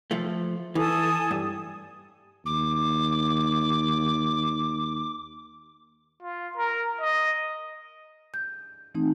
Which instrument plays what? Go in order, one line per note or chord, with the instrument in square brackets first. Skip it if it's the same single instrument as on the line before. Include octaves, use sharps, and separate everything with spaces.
[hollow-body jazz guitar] F3 A3
[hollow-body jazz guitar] E3 [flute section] A4 G#5 D#6
[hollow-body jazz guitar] G2
[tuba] D#2 [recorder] D6
[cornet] F4
A#4
D#5
[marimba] G6
E3 A3 C4 D#4